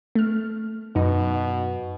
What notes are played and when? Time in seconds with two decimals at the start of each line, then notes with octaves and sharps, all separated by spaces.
0.15 A3 F6
0.96 F#2 B2 D#4